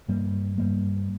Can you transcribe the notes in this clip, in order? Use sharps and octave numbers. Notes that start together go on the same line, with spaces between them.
G2 G3 A#3
G2 G3 A#3